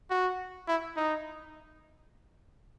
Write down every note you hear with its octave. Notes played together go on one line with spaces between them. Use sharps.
F#4
E4
D#4